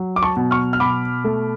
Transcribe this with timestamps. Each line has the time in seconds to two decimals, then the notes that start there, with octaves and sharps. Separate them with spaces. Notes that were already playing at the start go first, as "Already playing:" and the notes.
Already playing: F#3
0.16 D6
0.23 A5 C#6
0.37 B2
0.51 C#6 F6
0.73 F6
0.80 B2 B5 D6
1.24 A3